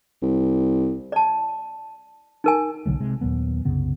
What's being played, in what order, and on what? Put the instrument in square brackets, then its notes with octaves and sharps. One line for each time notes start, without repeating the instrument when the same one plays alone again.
[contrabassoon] C2
[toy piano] D5 A5
D#4 A#4 G#5
[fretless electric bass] B1 D3 F#3 A3
C3 G#3
D#2 A#2 F#3 B3
C2 F#2 C#3 B3